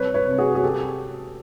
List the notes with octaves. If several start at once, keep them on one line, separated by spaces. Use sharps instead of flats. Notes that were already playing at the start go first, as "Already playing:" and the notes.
Already playing: C2 B4 C#5
B4 C#5
C3
F#4 G#4
G#4
G4 A4